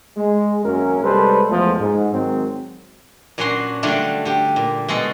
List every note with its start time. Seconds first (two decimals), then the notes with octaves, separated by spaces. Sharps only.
0.17 G#3
0.64 G#1 F#2 F#3 A#3 C#4 A#4
1.04 C3 G3 G#3 A4 B4 C5
1.48 E2 F3 G#3 A3
1.79 G#2
2.13 D#3 F#3 G#3 C4
3.38 A#2 F#3 C#4 D4 F#4 C6
3.83 D3 F#3 G3 A3 D4 F4
4.25 D3 G4
4.56 A#2
4.88 B2 G#3 F#4 A4